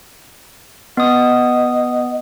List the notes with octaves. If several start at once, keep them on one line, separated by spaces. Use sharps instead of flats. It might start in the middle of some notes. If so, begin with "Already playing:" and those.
B3 D#5 D#6